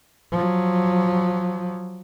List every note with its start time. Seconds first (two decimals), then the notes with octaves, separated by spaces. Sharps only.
0.32 F3 F#3